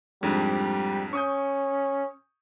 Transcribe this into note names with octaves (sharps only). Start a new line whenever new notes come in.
F2 G#2 G3 D4
C#4 C#6 D#6 G6